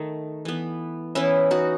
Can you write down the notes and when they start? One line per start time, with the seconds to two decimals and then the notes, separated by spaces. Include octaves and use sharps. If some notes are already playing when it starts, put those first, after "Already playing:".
Already playing: D#3 A3
0.45 E3 B3
1.15 E3 B3 C#4 E4
1.51 D#4 F#4